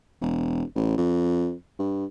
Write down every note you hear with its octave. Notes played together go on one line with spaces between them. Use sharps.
E1
A1
F2
G2